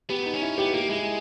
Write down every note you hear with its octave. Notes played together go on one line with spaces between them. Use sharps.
B3 G4
D#4
C#4
E4
B3 G4
A#3 G4
G#3 E4